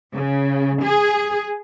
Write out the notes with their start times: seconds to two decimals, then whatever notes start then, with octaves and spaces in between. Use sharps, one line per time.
0.14 C#3
0.83 G#4